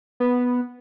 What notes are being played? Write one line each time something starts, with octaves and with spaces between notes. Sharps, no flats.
B3